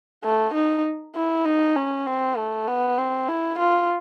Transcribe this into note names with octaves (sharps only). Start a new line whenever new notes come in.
A3
D#4
E4
D#4
C#4
C4
A3
B3
C4
E4
F4